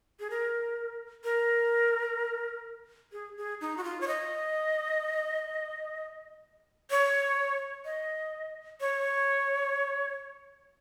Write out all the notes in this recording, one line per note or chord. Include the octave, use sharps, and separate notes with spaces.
G#4
A#4
A#4
G#4
G#4
D#4
F#4
F4
C#5
D#5
C#5
D#5
C#5